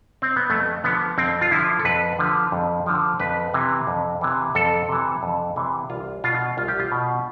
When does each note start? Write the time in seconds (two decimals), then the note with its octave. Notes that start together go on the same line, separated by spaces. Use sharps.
0.22 C4
0.36 B3
0.50 F2 A3
0.83 D3 F3 B3
1.18 F2 C4
1.41 F4
1.51 D3 F3 E4
1.80 A4
1.85 F2 B4
2.19 D3 F3
2.52 F2
2.86 D3 F3
3.20 F2 B4
3.54 C3 E3
3.87 F2
4.21 C3 E3
4.55 F2 A4
4.89 C3 E3
5.23 F2
5.56 C3 E3
5.90 C2 F4
6.24 B2 F4
6.57 C2 F4
6.68 G4
6.79 F4
6.92 B2